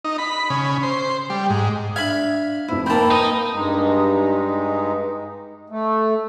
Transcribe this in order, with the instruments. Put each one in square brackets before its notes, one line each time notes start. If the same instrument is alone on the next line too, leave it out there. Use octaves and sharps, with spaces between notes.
[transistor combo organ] D#4
B5
C#3
C5
G3
G#2
[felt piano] D4 G#6 [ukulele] E5 [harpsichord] F5 B5
[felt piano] F1 G#2 [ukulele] E4
[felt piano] G#2 G6 [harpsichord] A#3 C4 [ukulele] A5 B5
[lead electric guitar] D#4 D#5 [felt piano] B4
[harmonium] G2 G#3 D#4
A3